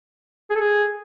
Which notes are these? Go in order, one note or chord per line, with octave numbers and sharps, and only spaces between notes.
G#4
A4
G#4